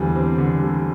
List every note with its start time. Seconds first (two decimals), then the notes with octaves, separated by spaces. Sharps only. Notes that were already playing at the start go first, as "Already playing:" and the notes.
Already playing: E2 D3 G3 C4
0.16 C4
0.38 D3
0.61 G3